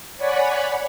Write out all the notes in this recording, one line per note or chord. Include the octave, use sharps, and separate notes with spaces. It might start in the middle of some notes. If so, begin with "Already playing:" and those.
C#5 D5 F#5 G#5 B5